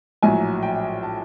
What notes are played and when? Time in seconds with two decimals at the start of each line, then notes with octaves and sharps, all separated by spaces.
0.22 A#1 A2 F#3 G#5
0.63 G5
1.03 A5